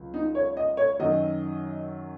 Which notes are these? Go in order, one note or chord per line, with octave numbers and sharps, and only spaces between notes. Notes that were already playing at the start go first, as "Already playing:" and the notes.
Already playing: C#2 C#3 F#3
D#4
C#5
D#5
C#5
F#2 D#3 F#3 D#5